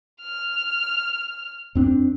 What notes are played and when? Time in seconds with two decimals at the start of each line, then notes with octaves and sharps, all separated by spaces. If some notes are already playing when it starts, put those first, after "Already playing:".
0.21 F6
1.75 F2 C4 D4